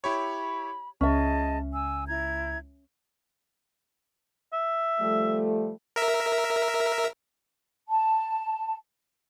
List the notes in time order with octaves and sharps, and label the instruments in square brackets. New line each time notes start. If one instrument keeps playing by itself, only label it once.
[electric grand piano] E4 G4 C#5 [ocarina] B5
[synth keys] C#2 [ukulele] C#4 E5 [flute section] G#4 D#5 A5
[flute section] G#5 E6
E4 A#5 G#6
[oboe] E5
[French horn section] F3 G3 A3
[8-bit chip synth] A#4 E5
[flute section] A5